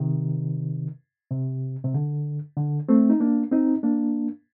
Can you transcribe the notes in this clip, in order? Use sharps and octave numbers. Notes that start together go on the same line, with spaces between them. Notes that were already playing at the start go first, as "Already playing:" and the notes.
Already playing: C3 D#3
C3
C3
D3
D3
A3 C4
D#4
A#3 D4
C4 D#4
A#3 D4